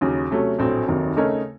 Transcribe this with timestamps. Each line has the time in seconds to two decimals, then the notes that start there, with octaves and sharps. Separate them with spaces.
0.01 D#2 C#3 F#3
0.30 C3 F#3 A3 C#4
0.58 A#1 A2 F#3 A3 C4
0.88 F1 D#2 D#3 F#3
1.17 C#3 A3 D#4 A#4 C#5